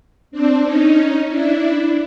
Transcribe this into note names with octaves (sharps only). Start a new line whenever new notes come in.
C4 D4
C#4 D#4
D4 E4